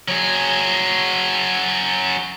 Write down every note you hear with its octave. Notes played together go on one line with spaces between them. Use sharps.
F#3 G#4